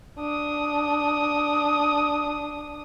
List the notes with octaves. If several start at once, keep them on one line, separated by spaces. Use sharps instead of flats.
D4 D#6